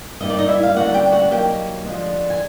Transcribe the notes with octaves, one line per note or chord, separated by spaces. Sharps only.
G2 D#3 G3 A#3 D#4 D#5
D5
D#4 D#5
E4 E5
F5
D2 D3 G3 A#3 C#4 F#4 F#5
G4 G5
F#4 F#5
B2 F#3 A#3 D#4 G4 G5
D3 F3 G#3 C4
G#5